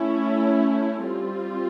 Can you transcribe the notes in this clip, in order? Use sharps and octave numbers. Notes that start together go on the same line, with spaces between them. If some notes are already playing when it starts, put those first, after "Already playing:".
Already playing: A3 C#4 E4
G3 C4 F4